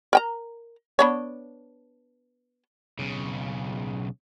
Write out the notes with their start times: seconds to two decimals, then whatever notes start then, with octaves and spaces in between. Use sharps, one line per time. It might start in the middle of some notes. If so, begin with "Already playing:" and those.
0.13 A#4 G5 A#5
0.99 B3 D4 C#5
2.99 B1 C#3